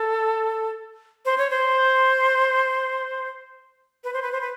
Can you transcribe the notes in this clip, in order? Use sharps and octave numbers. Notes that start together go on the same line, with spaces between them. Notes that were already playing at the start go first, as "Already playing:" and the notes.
Already playing: A4
C5
C#5
C5
B4
C5
B4
C5
B4